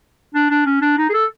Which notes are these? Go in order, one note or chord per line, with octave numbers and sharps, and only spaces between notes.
D4
D4
C#4
D4
D#4
G#4
A4